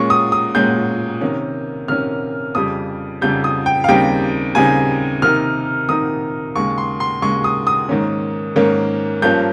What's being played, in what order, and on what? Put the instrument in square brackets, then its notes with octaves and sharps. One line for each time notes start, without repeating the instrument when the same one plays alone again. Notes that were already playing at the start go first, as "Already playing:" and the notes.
Already playing: [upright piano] A#2 G#3 C#4 C#6
D#6
D#6
A#2 G#3 C#4 G6
C3 D#3 A#3 C#4
C3 D#3 A#3 C#4 F6
F2 C#3 G3 D#6
F2 C#3 G3 G6
D#6
G5
F5
D#2 C#3 G3 C4 D#4 G5
D#2 C#3 G3 C4 D#4 G#5
C3 D#3 A#3 D#4 F6
C3 D#3 A#3 D#4 D#6
D#2 C#3 G#3 C#6
C6
C6
D#2 C#3 G#3 C#6
D#6
D#6
G#2 D#3 A#3 C#4
G#2 D#3 A#3 C#4
G2 F3 A#3 C#4 G6